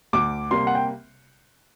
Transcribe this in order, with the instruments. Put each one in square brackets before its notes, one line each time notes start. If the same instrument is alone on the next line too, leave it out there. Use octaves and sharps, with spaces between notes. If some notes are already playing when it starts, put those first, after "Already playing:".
[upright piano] D2 [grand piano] D6
[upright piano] C3 G3 A#3 [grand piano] C6
[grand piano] F#5
G5